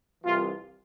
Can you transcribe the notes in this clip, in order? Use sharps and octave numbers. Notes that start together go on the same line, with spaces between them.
C2 C3 E3 F4